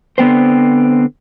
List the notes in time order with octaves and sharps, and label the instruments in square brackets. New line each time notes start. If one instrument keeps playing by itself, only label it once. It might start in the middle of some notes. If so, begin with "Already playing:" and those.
[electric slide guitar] D3 B3 C4 C5